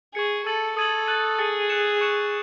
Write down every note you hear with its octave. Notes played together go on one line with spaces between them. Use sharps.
G#4 C#6 G#6 C#7
A4 E6 A6 D#7 F#7
A4 D#6 G#6 D#7 F#7
F#6 A6 D#7 F#7
G#4 D#6 A6 C#7 F#7
F#6 C#7 E7
C#6 F#6 C#7 E7